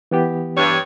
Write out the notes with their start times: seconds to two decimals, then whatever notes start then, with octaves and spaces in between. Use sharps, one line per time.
0.11 E3 B3 G4
0.57 G2 C#5